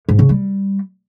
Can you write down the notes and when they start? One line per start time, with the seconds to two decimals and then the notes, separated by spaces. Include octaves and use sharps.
0.09 G#2
0.19 C#3
0.29 G3